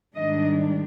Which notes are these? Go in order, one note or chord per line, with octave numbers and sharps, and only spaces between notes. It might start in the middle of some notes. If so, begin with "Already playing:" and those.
G#2 D#3 G3 D4 D#5